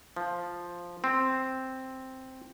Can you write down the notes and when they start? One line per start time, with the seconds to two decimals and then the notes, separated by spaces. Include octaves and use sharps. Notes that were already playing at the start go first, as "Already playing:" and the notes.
0.16 F3
1.04 C4